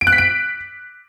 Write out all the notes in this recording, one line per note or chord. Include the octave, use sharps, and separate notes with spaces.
D7
F#6
B6
D7